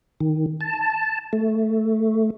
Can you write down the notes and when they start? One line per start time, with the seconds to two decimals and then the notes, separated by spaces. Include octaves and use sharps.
0.20 D#3
0.61 A5
1.33 A3